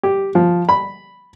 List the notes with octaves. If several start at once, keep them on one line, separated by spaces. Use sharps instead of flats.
G4
F3
B5